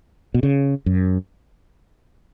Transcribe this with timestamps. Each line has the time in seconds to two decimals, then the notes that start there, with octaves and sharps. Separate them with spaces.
0.34 B2
0.43 C#3
0.86 F#2